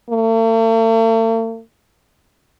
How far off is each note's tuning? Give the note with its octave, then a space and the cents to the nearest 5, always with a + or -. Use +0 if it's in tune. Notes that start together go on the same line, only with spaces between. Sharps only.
A3 +45